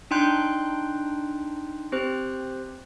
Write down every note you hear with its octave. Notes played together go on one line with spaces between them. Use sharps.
D4 D#4 G5 C6 F#6 G6
C4 G4 C5 F#6